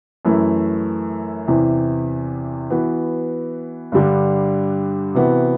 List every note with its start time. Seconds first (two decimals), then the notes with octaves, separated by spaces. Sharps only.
0.25 F#2 E3 A3 E4
1.48 E2 C3 E3
2.70 E3 B3 F#4
3.92 G2 D3 G3 D4
5.15 C3 E3 B3 F#4